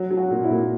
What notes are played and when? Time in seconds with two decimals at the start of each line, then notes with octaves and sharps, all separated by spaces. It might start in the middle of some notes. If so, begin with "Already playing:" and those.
Already playing: F#3
0.10 F#3
0.17 F#4
0.31 A#2
0.44 E4
0.50 A#2